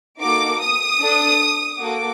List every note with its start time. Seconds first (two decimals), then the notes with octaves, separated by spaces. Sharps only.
0.21 A#3 D#4 F#4 A4 D6
0.61 D#6
1.00 D4 A4
1.78 A#3 F#4 A4 D6